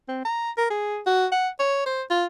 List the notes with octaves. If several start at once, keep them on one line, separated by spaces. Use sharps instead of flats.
C4
A#5
A#4
G#4
F#4
F#5
C#5
C5
F4